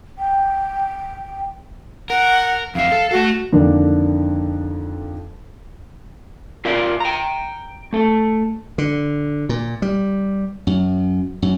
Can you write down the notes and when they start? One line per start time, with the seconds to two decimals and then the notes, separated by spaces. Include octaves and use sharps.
0.18 G5
2.10 A#4 F#5
2.75 F2 E5 F5
2.92 A4
3.11 A3 F#4 A4
3.53 F2 D3 D#3 A#3 D4
6.65 F4 A#4 D5 E5 F5
7.00 G5 A#5
7.93 A3 A4
8.78 D3
9.49 A#2
9.82 G3
10.67 F#2
11.42 F#2